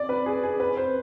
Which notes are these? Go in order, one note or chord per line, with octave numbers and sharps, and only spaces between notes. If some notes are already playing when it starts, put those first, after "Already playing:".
Already playing: D5
B4
G#4
G#4
B4
C5